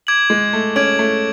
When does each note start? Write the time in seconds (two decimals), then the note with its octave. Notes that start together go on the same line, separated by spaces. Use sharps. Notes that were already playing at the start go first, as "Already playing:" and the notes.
0.07 D6 G#6 D7 F#7
0.30 G#3
0.53 A3
0.76 C#4 D6 G#6 D7 F#7
0.99 A3